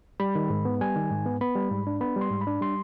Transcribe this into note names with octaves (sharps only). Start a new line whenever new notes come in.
G3 B5
D#3
G#2
B3
G3 G#5
D#3
G#2
B3
B3 B5
G3
G#2
D4
B3 B5
G3
C6
G#2
B5
D4
G3 C6